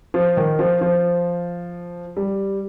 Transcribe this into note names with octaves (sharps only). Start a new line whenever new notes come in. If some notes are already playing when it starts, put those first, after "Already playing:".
F3
D#3
F3
F3
G3